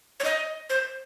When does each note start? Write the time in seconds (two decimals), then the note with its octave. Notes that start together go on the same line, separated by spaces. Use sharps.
0.20 C#5
0.24 D#5
0.70 C5